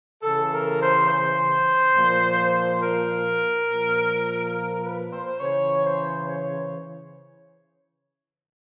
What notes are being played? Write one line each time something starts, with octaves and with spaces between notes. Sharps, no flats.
C#3 E3 A4
A#4
C5
C5
A#2 F3
A#4
A#2 F3
A#4
B4
C5
C#3 E3 C#5
C5
C#5